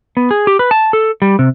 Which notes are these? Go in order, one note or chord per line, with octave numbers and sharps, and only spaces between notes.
B3
G#4
G4
B4
A5
A4
G3
C3